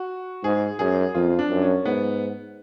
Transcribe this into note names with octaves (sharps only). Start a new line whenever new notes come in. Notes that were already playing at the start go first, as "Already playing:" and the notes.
Already playing: F#4
G#2 G#4
F#2 G#4
F2 F4
D4
F#2
C#4
G#2 B3